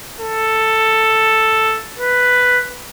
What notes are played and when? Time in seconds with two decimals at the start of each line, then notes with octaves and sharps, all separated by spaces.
0.20 A4
1.98 B4